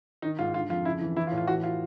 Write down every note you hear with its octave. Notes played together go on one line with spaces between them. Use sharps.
D#3 D#4
G#2 F4
D3 F4
F2 F4
C#3 E4
E3
E3 E4
F4
A2
F4
E3 F#4
F4